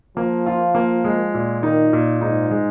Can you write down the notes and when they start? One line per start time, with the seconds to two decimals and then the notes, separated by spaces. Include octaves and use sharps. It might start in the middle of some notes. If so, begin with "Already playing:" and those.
0.17 F3 A#3
0.46 F4
0.75 A#3
1.04 G#3
1.34 A#2
1.62 D#3 D#4
1.93 A#2
2.21 G#2 D#4
2.51 G#3